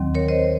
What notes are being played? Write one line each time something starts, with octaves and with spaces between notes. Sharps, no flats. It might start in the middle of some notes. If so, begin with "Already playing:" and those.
Already playing: D#2 D#3 F#3 C4
A#4 C#5
C5 D#5